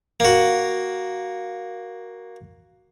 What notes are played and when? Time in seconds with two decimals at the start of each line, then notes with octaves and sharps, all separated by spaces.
0.20 A#3 F#4